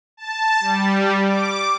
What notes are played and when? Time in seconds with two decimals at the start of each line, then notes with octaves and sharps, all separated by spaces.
0.17 A5
0.60 G3
1.25 D6